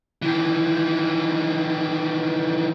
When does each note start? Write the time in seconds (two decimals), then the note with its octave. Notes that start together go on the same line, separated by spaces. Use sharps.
0.22 D#3 E3